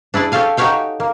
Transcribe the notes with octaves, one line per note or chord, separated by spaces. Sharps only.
D4 E4 G#4 D5
G4 A4 C#5 F5 G#5
D#4 F#4 G4 C#5 F5 G5
A#3